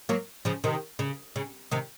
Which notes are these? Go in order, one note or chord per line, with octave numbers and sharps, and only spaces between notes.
F#3 A#3
C#3 F3
C3 D#3
C#3
C#3
C3 D#3